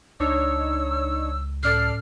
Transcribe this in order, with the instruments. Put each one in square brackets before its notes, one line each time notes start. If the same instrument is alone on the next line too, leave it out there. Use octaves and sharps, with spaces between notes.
[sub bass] C#2 [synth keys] D4 D#4 C#5 [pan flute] E6
[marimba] A2 C#4 [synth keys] A4 D5 C7 [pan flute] F6